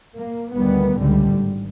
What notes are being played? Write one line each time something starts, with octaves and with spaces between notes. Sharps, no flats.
A#3
D2 D#3 G3 B3
C#2 A2 D3 G3
G#1